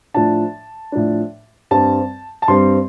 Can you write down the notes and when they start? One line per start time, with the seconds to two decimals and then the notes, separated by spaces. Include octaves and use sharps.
0.14 A2 F3 D4 A5
0.92 A2 F3 D4
1.71 G2 G3 C4 A5
2.42 A5
2.48 G2 G3 C4 C6